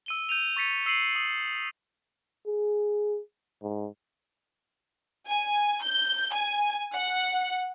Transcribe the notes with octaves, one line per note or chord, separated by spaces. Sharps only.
E6 D#7 G7
G6 D#7 F7
C#6 A6 B6 C#7 D#7
E6 C7 D#7 F#7
D#6
G#4
G#2
G#5
G6
G#5
F#5